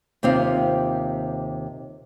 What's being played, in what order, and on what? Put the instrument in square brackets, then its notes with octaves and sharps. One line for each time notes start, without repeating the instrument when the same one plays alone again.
[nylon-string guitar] D#2 C3 C4 F4 F5